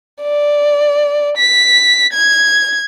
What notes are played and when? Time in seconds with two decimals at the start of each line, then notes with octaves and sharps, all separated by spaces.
0.22 D5
1.37 B6
2.13 G#6